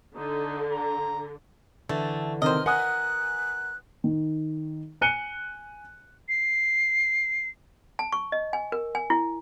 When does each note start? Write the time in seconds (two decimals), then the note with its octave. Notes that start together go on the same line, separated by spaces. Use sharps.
0.16 D3 D#4
0.72 A#5
1.89 D3 E3 A3
2.42 C3 D#3 C5 D#5 F6
2.66 A#4 F#5 G#5 D#6 F#6
4.04 D#3
5.01 G#5 F#6 C#7 D#7 G7
6.28 C7
7.99 A5
8.12 C#6
8.32 D#5
8.53 G#5
8.72 A#4
8.95 G#5
9.10 E4